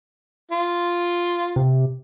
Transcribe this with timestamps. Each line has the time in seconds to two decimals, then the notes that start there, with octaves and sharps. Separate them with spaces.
0.51 F4
1.56 C3